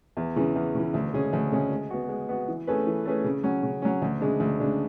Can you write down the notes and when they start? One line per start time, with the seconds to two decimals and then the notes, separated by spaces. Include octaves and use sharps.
0.17 E2
0.36 C#3 E3
0.55 E2
0.75 C#3 E3
0.94 D2
1.14 C#3 G#3 C#4 G#4
1.33 D2
1.52 C#3 G#3 C#4 G#4
1.71 G#3
1.90 B3 F#4
2.09 G#3
2.29 B3 F#4
2.48 E3
2.67 A3 C#4 G#4 B4
2.87 E3
3.06 A3 C#4 G#4 B4
3.24 C#3
3.43 F#3 C#4
3.63 C#3
3.82 F#3 C#4
4.02 D2
4.21 C#3 G#3 D4
4.40 D2
4.60 C#3 G#3 D4